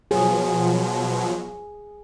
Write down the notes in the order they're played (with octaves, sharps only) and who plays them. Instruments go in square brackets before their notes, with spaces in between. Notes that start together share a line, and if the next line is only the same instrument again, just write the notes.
[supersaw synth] B2 F3 F#3 [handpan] G#4